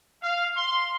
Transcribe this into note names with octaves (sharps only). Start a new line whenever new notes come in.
F5
C6